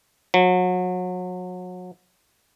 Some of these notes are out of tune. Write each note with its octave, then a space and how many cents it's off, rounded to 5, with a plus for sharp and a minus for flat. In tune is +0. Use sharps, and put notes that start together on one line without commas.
F#3 -30